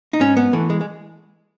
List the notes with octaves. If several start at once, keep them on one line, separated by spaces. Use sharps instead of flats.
D#4
G#2 C#4
B3
E3 A3
G#3
G#3